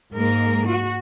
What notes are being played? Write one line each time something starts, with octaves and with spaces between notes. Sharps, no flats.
G#2 G#3 A#3 A#4
F#4